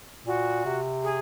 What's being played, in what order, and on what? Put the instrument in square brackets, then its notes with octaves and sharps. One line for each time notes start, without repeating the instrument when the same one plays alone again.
[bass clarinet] A#2 [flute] F#4
[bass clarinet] C3
[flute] G#4